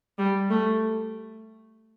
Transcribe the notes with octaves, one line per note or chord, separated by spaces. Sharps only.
G3
A3